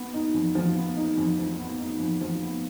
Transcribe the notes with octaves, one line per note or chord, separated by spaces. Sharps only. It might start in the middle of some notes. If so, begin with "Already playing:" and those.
Already playing: B3
D#4
F2
F3
B3
D#4
F2
F3
B3
D#4
F2
F3
B3